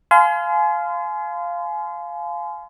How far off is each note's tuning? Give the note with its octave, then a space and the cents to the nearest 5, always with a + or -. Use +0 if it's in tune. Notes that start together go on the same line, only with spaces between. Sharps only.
F5 -5 G#5 +35 C6 -30